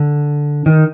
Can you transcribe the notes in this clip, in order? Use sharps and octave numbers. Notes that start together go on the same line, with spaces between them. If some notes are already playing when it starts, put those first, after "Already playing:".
Already playing: D3
D#3